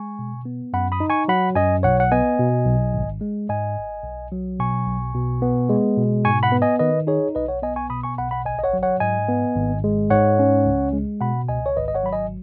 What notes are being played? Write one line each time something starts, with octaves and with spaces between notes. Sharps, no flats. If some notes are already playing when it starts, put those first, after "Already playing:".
Already playing: G#3 G#5 C#6
B2
B3
F#2 F#5 B5
B5 D#6
D#4
G#5 C#6
F#3 F#5 B5
F#2 D#5 G#5
B1 C#5 F#5
F#5
B3 D#5 G#5
B2
B1
G#1
G#3
G#2 D#5 G#5
G#1
B1
F#3
B2 G#5 C#6
B1
B2
B3
G#3
B2
G#2 G#5 C#6
F#5 B5
B3
D#5 G#5
D#3 B4 D#5
D#4 G#4 C#5
B1 B4 D#5
C#5 F#5
B3 D#5 G#5
G#5 C#6
B2 B5 D#6
G#5 C#6
B1 F#5 B5
F#5 B5
G#1 D#5 G#5
D#5
C#5 F#5
F#3
C#5 F#5
G#2 D#5 G#5
B3
G#1
G#3
G#2 C#5 F#5
C#4
C#2
G#3
B2 F#5 B5
C#2 D#5 G#5
C#5
G#1 B4 D#5
D#5
C#5 F#5
F#3 B5
D#5 G#5